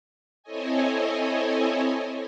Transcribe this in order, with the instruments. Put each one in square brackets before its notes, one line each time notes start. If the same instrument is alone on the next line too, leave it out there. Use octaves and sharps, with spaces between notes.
[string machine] C4 E4 A4 C#5 D#5 G#5